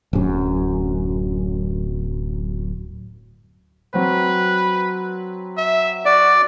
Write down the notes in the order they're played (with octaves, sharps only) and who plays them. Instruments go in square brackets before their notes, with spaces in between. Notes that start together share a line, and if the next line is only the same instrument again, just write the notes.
[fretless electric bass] D1 F#2
[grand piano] F#3 C4 [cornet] B4
[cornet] E5
[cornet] F#4 [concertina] D5